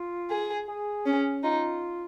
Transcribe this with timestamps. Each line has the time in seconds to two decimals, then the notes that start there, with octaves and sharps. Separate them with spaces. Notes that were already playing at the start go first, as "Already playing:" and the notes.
Already playing: F4
0.31 G#4
0.68 G#4
1.06 C#4
1.44 D#4 F4